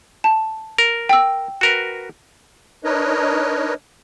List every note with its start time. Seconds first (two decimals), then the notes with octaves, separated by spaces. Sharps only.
0.24 A5
0.78 A#4
1.09 G5 E6
1.61 F#4 A#4 B4
2.84 D4 D#4 A#4 B4 C#5 D#5